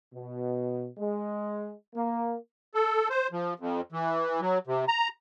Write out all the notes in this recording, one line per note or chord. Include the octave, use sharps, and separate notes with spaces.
B2
G#3
A#3
A4
C5
F3
F2
E3
F#3
C3
A#5